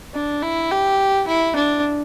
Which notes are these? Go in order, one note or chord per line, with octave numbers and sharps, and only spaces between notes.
D4
E4
G4
E4
D4